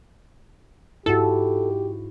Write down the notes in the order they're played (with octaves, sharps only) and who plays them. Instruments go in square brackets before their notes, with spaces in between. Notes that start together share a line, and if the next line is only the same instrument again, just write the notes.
[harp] G#2 [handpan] E4 F#4 [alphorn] G4 [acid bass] A4